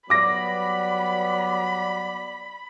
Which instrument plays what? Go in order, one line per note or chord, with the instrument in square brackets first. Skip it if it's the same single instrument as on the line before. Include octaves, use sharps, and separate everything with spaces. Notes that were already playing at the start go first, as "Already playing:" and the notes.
[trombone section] F#3 G3 B3 [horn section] D5 [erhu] B5 [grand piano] D6 A#6